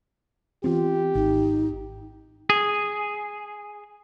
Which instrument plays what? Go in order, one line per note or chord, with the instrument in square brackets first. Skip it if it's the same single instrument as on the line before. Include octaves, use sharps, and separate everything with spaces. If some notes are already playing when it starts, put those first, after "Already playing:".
[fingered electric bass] E3 B3 C4 [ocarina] F4 [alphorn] G4
[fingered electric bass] G#1 [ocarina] D#4
[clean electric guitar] G#4